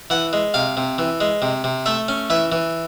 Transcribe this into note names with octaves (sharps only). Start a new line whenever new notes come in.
E3 F#5
G#3
C3 F5
C3
E3
G#3
C3
C3
A3 E5
C#4
E3 E5
E3